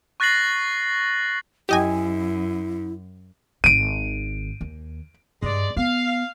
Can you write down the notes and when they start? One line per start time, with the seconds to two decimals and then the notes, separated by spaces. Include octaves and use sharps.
0.20 C#6 F#6 A6 A#6 C7 F#7
1.69 F#2 E4 G4 D#5 G#5
3.64 G#1 D#3 D7 D#7
4.61 D#2
5.42 G2 G#3 D5
5.76 B3 F5